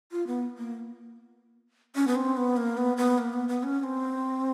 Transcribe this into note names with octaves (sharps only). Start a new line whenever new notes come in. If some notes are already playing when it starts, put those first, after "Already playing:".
F4
B3
A#3
C#4
B3
C4
B3
A#3
B3
B3
A#3
B3
B3
C#4
C#4
C4